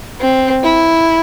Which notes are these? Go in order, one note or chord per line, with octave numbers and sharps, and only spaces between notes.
C4
E4